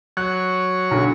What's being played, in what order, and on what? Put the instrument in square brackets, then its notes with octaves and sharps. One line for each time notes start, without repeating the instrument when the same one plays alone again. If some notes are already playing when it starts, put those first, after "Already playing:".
[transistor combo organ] F#3 C#5 [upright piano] F#6
[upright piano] B1 D3